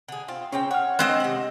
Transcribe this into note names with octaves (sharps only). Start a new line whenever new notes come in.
D3 G#4
C4 F4
C#3 C4 C#4 G5
C#5 F#5 F6
G#3 C4 D#5
C3 F#5